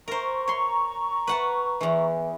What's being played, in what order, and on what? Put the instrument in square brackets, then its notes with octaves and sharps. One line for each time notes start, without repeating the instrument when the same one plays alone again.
[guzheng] A#4 C5 [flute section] A#5 C#6
[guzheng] C#5 C6
B4 F#5 A5
E2 E3